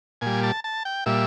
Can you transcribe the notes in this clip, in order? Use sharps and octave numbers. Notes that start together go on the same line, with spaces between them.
A#2 G3 G#5
A5
A5
G5
A#2 G3 E5